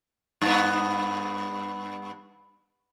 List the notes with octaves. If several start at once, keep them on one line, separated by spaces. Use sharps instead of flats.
G2 B3